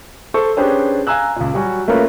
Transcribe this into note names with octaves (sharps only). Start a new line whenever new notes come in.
A4 C5 C#6
C#4 D4 G4 G#4 B4 C5
F5 G#5 A#5 E6 F#6
C#2 A#2
F#3 G3 F#4 G#5
A3 A#3 C#4 F4 A#4 B4